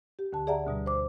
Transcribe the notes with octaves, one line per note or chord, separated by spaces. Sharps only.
G4
D2 D3 A5
G#4 D5 E5 F#5 A#5
D2 B2 G3
C5 D6